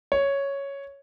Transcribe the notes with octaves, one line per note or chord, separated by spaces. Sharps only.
C#5